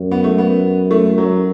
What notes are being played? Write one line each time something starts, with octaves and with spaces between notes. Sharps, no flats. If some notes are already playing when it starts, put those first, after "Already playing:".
Already playing: F#2
B3
A3
B3
A3
F#3